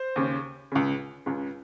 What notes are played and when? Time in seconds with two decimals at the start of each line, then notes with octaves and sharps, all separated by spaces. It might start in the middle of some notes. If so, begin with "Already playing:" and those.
Already playing: C5
0.16 D#2 C#3
0.72 C#2 C#3
1.26 C#2 C#3